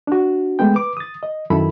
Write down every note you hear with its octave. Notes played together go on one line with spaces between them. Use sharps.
D4 F#4
G#3 A3 B3 G5
B4 D6
D#6 A6
D#5
F#2 D#3 E4 A4 B5